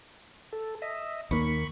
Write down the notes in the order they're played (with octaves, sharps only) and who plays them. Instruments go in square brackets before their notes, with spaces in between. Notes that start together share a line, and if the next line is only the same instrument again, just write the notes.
[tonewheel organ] A4
D#5 E5
[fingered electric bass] D#2 D#3 A#3 [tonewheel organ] B5 C#6